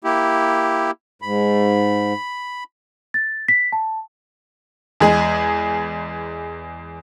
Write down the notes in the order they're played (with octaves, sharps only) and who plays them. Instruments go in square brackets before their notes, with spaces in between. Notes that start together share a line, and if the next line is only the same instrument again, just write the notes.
[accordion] A#3 E4 G4
[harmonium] G#2 [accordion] B5
[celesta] A6
B6
A5
[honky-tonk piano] E2 G#3 G#4